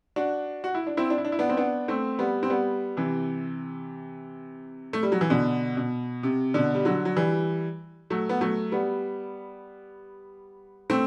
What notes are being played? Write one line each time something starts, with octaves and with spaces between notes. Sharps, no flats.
D4 F#4
F#4
E4
D4
C4 E4
D4
E4
D4
E4
B3 D4
C4
B3 D4
A3 C4
G3 B3
C4
G3 B3
C3 E3
A3
G3
F#3
E3
B2 D3
B2
C3
B2 D3
G3
D3 F#3
F#3
E3 G3
F#3 A3
B3
F#3 A3
G3 B3
A3 C4